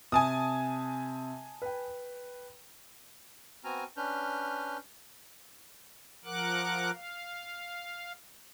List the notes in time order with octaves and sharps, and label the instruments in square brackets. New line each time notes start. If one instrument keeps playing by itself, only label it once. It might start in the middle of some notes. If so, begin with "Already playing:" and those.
[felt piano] C3 [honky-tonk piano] G#5 A5 D#6
[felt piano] B4 G5
[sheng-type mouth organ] B3 C4 F#4 G#5 A#5 F6
C#4 D4 B4 F6 G6
[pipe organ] F3 A#4 F#5 D6 F#6
F5